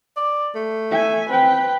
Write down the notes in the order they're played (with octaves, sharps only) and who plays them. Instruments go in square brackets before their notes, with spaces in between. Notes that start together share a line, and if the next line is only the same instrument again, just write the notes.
[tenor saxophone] D5
A3
[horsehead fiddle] E5 G#5
[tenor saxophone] C4 [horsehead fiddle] B4 G5